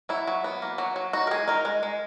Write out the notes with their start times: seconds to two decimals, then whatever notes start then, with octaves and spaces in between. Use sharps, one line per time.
0.09 F#3 E4
0.28 F#3
0.44 B3
0.62 A#3
0.78 F#3
0.96 F#3
1.13 D#4 F#4
1.27 A#4
1.31 G#3 G#4
1.48 D#4 A#4
1.65 G#3
1.83 G#3